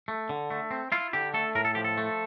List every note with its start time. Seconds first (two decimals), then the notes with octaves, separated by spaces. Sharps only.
0.08 A3
0.29 D3
0.50 A3
0.71 C4
0.92 E4 F4
1.13 D3 G4
1.34 A3 A4
1.55 A2 A#4
1.65 A4
1.75 F3 G4
1.84 A4
1.97 A3